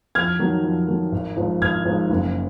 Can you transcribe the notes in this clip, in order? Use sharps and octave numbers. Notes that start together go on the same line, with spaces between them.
F2 F6 G#6
D#3 F#3
F2
D#3 F#3
G#1
G#2 F3
G#1 F6 G#6
G#2 F3
F#1